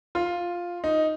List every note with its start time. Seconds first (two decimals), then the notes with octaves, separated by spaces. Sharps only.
0.15 F4
0.84 D#4